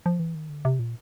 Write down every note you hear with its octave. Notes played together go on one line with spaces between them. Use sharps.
F3
E3
D#3
D3
C3
A#2